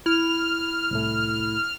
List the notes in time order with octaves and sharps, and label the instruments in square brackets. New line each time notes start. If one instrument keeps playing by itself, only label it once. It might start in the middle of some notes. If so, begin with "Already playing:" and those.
[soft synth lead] E4 [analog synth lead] F6
[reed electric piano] C2 A2 A3